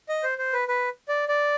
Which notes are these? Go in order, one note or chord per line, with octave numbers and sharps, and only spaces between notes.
D#5
C5
C5
B4
B4
D5
D5